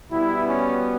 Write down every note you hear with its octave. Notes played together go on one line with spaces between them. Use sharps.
B2 G3 B3 E4
C#4